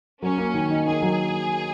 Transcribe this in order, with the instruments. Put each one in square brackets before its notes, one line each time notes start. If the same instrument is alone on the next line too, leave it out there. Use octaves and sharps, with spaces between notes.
[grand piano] F#3 [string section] C#4
[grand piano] A#3
D#3
D#4
[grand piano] A#3 [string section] G#4
[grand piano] F#3